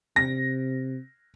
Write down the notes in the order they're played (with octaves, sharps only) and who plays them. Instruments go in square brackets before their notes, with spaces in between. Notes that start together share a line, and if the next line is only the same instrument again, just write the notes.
[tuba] C3 [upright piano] A#6